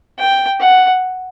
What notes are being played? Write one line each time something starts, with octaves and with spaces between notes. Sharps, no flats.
G5
F#5